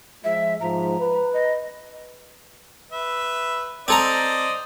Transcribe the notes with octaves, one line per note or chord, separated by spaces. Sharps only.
F3 G#3 E5
G#2 F3 A#5
B4
D#5
B4 E5
C4 A4 C5 D5 D#5 A#5